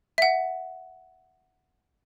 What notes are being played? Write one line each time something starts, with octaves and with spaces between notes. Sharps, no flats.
E5 F#5